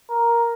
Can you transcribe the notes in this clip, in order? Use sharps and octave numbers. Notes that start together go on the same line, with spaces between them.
A#4